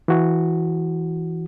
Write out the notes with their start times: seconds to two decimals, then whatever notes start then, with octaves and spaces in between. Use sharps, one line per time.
0.08 E3 F#4